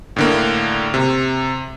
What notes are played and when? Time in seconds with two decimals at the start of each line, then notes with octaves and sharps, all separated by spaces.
0.16 A2 D3 A#3
0.94 C3